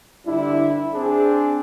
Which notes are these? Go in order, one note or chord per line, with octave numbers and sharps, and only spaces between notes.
G2 D3 G3 D4 E4
C4 D4 G#4